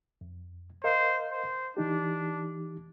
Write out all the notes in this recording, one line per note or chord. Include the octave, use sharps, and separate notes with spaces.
F2
A#4 C5 D#5 F5
C5
E3 D4 D#4 G4